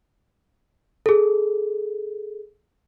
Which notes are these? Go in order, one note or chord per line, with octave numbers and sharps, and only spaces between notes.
G#4 A4